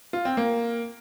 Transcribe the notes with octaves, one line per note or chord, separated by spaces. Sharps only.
F4
C4
A#3